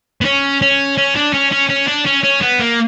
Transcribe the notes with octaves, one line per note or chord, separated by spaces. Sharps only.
B3
C#4
C#4
C#4
D4
C#4
C#4
C#4
D4
C#4
C#4
B3
A#3